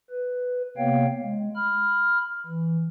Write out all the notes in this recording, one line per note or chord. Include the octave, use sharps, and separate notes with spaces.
B4
C3 A#3 B3 C#5 F5 G5
G#3
B5 F6
E3